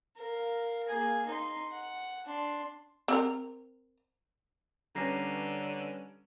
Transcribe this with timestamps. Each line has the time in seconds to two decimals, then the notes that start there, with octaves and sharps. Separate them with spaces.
0.18 A#4 F5
0.88 A#3 G#4
1.27 D#4 C6
1.72 F#5
2.26 D4 C6
3.08 C4 A#4
4.95 D3 G3 C#4 B4 A#5 A#6 C7